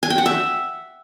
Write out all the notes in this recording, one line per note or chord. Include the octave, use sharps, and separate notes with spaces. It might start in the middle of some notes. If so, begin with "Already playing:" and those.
G#5
G5
F#5
E5